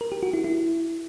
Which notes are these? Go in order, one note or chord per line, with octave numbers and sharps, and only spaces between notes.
A#4
G4
F#4
E4
E4